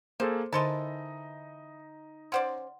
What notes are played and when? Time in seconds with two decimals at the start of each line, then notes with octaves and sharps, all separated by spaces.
0.20 A#3 G#4 A4 C5
0.52 D3 E3 D#4 A4 C5 D#5 A5 C6
2.32 C#4 C5 D5 F#5 C6